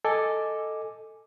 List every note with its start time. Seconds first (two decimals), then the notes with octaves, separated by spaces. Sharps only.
0.05 A4 D#5 G#5 D6